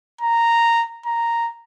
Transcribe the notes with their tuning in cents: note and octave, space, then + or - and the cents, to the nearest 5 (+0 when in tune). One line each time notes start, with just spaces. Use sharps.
A#5 -10
A#5 -5